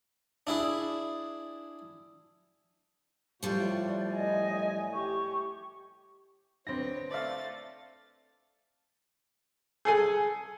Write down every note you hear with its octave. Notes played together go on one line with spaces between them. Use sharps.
D4 E4 G#4
A2 F3 G3 F4 F#4 D5
D#5 G#5
G4 C#6
D2 C4 B4 C#5 A#6
A3 C5 D5 E5 F5 A6
G#4 A4 G#5